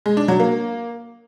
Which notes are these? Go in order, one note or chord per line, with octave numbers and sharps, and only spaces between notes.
G#3
D4
F#3
A#3